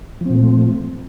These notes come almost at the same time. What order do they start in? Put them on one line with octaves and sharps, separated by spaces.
F3 C4 A#2 A3